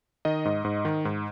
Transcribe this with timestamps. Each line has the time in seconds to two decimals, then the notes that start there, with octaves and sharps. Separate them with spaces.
0.25 D#3 D#5
0.45 G#2
0.65 G#2
0.85 D#3
1.05 G#2